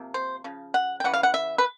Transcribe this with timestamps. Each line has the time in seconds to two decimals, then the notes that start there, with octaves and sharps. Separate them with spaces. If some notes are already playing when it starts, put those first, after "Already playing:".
Already playing: C3 F3 A#3
0.14 C5
0.44 C#3 F3
0.74 F#5
1.00 G5
1.04 C#3 E3 F#5
1.14 F5
1.23 F#5
1.34 E5
1.58 B4